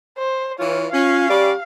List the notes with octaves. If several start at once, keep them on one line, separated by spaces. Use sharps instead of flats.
C5
E3 F4 C#5
C#4 F4 F5
G3 C#4 G4 D5